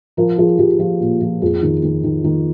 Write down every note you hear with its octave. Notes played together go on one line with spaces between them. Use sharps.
F3 A#4
F3 G#4
F3 G4
F3 F4
A#2
F3
F2 G#4
D#3
D#3
D#3
D#3